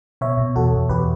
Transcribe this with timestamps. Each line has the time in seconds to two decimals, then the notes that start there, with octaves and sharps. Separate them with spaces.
0.21 B2 C#5 E5
0.38 B2
0.56 E2 F#4 A4
0.73 E2
0.89 E2 G4 B4